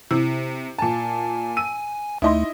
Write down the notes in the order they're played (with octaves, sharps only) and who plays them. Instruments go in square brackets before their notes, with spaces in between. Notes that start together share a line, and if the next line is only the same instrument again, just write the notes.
[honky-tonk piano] C3 [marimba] E4
[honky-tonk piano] A#2 A5 [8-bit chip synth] G#5
[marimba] E6 [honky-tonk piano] D#7
[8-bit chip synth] D2 A3 [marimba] D#4 C6 [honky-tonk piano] E4 D#5